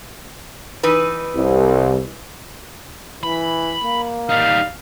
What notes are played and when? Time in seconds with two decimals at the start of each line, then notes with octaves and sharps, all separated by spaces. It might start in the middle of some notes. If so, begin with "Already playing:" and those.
0.83 E3 D#4 B4
1.35 C2
3.23 E3 B5
3.84 A#3
4.29 G3 D#4 F5